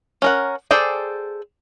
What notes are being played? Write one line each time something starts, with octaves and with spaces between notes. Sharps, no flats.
C#4 A#4 F#5
G#4 A4 C5 D5 G5